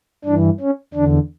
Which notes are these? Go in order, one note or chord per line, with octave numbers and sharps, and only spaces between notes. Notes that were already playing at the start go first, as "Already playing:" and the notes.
G2 E3 D4
C#4
E2 D3 D4